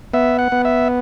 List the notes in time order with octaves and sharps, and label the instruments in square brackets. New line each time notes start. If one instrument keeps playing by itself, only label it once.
[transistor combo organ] B3 E5
F#5
B3
E5